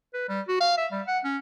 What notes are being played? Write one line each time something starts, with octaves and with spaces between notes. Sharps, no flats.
B4
G3
F#4
F5
E5
G3
F#5
C#4